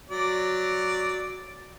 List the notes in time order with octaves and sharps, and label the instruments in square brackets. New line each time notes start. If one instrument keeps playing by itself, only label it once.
[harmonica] F#3 D5